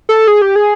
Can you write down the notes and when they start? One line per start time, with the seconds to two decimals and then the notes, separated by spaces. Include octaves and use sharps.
0.09 A4
0.28 G#4
0.42 G4
0.56 G#4